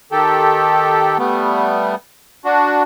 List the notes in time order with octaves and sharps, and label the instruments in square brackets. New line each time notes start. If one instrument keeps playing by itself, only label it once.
[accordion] D#3 G4 A4
G3 A3 B3
D4 F#4